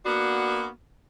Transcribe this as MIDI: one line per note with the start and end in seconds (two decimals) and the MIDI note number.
0.05 0.68 58
0.05 0.68 59
0.05 0.68 62
0.05 0.68 66